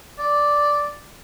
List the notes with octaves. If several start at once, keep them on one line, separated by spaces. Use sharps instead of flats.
D5